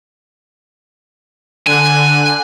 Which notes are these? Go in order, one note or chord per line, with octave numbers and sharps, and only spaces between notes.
D3 G#5 F#6